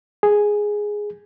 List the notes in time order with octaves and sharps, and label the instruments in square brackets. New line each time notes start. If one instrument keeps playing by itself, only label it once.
[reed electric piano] G#4